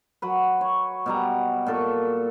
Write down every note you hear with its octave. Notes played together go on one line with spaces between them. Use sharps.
F#3 B4
C#5
B2 G3 A#5
A#2 A4 C#6